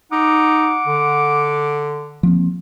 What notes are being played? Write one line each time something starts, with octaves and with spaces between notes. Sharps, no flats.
D#4 F#5 D6
D3
F3 A#3 C4